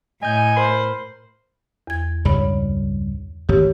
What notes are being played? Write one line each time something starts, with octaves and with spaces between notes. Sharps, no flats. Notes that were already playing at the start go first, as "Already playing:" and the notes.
A2 D#5 G#5 G6
A#4 C5 B5 C7
E2 G#6
C#2 G2 G3 C#5 B5
G#1 D2 G4 C#5